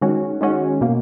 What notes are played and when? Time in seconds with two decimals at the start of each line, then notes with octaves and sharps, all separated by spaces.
0.01 D#3 G#3 C#4 F#4
0.41 D#3 G#3 C#4 F#4
0.81 B2 A#3